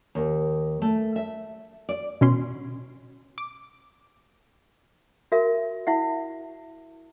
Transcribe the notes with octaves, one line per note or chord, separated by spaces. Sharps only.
D#2
A3
E5
D5
B2 C#4 C6
D6
F#4 A#4 E5
E4 E5 F#5